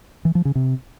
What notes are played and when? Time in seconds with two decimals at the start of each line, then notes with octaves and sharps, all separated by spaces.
0.25 E3
0.35 F3
0.45 C#3
0.55 C3